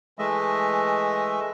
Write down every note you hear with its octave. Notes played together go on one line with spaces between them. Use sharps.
E3 G#3 A3 D#5 E5